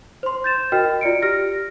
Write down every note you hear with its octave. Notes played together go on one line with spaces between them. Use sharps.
C5 C6
G6 A6 E7
F#4 A#4 D#5 G5 F6
F4 D5 C#7 D7
G4 F6 A#6